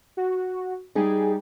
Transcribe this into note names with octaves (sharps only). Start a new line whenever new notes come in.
F#4
G3 D#4 G4 G#4